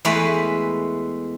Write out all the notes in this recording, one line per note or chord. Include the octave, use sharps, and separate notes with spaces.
E2 G#3 A3 E4 B4 G5